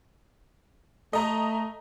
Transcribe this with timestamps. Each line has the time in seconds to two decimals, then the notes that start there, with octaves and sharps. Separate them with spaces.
1.13 A3 D#5 A#5